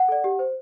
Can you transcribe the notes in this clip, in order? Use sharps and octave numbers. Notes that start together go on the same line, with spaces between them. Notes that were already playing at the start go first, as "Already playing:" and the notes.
Already playing: F#5
A4 D5
G4
C5